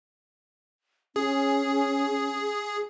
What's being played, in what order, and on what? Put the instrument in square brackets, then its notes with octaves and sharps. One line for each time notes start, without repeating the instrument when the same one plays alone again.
[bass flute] C#4 [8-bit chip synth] G#4